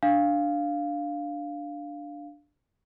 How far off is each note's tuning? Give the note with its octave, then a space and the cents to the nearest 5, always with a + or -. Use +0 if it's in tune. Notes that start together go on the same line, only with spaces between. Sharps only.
D4 +0 F5 +0